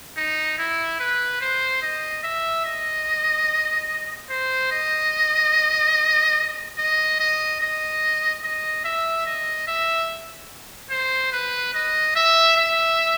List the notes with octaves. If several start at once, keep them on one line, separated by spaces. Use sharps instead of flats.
D#4
E4
B4
C5
D#5
E5
D#5
C5
D#5
D#5
D#5
D#5
D#5
E5
D#5
E5
C5
B4
D#5
E5
E5